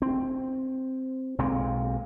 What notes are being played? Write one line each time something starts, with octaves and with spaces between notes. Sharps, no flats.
C4
B1 A#2 G#3 C4